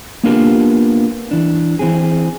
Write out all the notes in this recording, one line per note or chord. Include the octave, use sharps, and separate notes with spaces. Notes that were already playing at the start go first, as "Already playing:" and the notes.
A#3 B3 D4 F4 G4 A#4
E3 D4
E3 C4 G#4